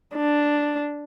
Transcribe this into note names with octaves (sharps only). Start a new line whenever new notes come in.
D4